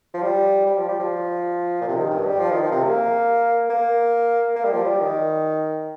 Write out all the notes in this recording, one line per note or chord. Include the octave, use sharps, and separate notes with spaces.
F3
G3
G3
F3
G3
F3
A#2
C3
D#3
G2
G3
F3
D#3
F3
C3
A#3
A#3
A#3
G3
F3
G3
D#3